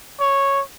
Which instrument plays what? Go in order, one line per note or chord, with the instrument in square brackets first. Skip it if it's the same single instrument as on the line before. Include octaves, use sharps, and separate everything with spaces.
[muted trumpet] C#5